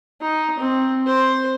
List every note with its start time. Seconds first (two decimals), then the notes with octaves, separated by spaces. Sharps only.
0.21 D#4
0.59 C4
1.06 C5